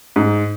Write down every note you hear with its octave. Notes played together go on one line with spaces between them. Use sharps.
G#2